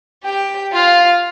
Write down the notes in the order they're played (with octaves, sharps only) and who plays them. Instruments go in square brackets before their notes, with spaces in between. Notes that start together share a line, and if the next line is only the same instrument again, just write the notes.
[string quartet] G4 G5
F4 F5